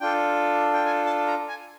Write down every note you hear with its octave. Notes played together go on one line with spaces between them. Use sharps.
D4 F4 A4 G5
G5
G#5
A5
A#5
G#5